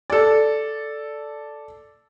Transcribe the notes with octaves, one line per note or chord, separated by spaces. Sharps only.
A4 D5